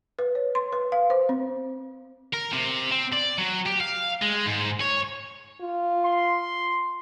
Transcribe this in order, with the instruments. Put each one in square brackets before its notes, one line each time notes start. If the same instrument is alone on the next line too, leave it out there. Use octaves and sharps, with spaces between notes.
[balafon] B4
C#5
C6
B4
F5
C5
C4
[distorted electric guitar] A#4
C3
C4
D5
F#3
G4
F5
G#3
G#2
C#5
[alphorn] F4
[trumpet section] C6